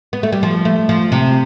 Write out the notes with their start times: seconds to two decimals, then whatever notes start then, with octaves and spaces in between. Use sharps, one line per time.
0.13 B3
0.23 A3
0.33 G3
0.43 F3
0.65 A3
0.89 F3
1.12 C3